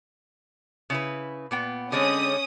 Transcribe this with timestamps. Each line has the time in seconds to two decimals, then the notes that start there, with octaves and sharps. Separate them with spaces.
0.90 C#3 E4 B4
1.51 A#2 B3 G5
1.92 D3 G#3 C4 C#4 D#6